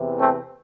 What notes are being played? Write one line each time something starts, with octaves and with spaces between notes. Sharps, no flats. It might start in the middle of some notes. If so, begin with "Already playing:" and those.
Already playing: E2 C3 E3
A3 C4